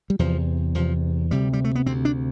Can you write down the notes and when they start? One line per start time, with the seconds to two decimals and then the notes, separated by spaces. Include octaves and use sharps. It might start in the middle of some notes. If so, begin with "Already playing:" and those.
0.10 G3
0.19 E2 C3 F3
0.75 E2 C3 F3
1.31 D2 C3 G3
1.53 G3
1.64 A3
1.75 B3
1.86 D2 C3 C4
2.05 D4